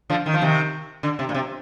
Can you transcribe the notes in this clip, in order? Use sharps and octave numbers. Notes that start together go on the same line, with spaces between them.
D3 F3
D#3
F3
C3 D#3
D3
C3
A#2
C3